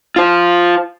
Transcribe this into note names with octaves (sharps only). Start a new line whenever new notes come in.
F4 C5